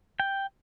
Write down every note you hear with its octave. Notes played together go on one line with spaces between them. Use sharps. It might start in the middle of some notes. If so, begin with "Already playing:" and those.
G5